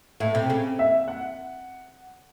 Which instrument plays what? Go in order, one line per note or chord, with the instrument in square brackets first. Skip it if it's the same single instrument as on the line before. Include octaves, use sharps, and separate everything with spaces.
[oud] A2 [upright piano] E5
[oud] C3
C#3
[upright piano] E5
F#5